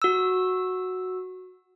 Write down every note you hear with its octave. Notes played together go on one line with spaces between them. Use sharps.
F#4 E6